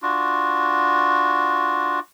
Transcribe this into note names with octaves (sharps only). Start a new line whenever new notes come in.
D4 F4 F#4